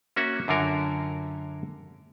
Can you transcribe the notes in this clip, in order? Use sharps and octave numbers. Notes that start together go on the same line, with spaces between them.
A#3 C#4 F#4 E5 F#5
F#2 D3 F4 A#4 C#5